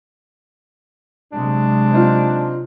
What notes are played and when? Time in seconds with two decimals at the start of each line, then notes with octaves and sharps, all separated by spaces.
1.32 C3 F#3 G#3 D4
1.91 C4 D#4 F4